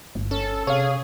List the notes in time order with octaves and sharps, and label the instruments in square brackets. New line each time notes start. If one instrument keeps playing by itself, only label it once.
[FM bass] G1
[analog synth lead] C#4 [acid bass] A4
[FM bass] C3 [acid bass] G#4 [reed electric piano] C#5 F5